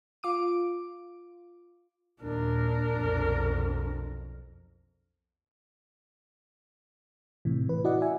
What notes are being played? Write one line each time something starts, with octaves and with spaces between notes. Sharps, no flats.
F4 D6 D7
D#2 A#2 D4 A#4
B1 F2
A2 C3 E3
B4
E4 F#4 D5 D#5 F#5
E5 G#5